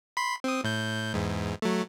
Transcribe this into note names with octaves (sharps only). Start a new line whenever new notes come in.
B5 C6
C4 D#6
A2 G6
E2 G#2
F#3 A3